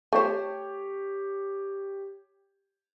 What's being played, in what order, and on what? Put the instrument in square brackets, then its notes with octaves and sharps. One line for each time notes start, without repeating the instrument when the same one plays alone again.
[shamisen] A3 C5 [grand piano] G4 C#5 G5